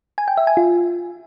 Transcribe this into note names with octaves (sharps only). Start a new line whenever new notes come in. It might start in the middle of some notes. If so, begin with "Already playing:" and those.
G#5
G5
E5
G#5
F4